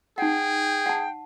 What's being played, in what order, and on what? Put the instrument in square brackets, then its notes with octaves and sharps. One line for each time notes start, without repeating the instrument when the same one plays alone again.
[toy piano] D#4 F#5 [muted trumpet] G#4 [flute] G5
[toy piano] F#5 A5